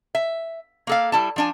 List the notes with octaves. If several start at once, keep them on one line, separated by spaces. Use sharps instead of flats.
E5
A#3 A4 F5
G3 E4 A5
F3 D4 G#5